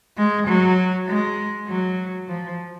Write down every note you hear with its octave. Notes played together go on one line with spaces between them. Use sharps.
G#3
F#3
G#3
F#3
F3